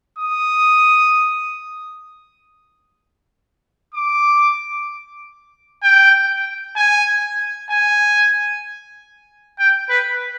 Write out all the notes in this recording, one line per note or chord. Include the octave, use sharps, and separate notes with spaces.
D#6
D6
G5
G#5
G#5
G5
B4